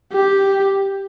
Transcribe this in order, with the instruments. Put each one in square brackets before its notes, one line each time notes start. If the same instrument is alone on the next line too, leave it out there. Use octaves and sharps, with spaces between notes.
[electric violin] G4